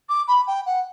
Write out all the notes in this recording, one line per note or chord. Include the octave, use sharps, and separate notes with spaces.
D6
B5
G5
F#5